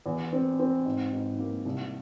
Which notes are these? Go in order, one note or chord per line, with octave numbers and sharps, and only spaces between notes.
E2
C4
C4
G#2
G#2
A#3
C2